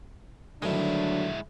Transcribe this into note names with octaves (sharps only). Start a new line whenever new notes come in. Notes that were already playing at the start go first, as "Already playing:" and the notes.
D2 G2 D#3 F#3 G#3 D4 E4